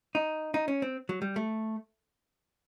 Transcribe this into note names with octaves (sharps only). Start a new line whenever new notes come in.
D#4
D#4
C#4
C4
F#3
G3
A3